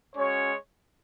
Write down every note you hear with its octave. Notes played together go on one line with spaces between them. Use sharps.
G#3 C#4 F#4 C#5